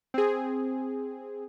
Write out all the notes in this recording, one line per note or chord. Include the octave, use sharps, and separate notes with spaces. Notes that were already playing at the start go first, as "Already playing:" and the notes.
C4 G#4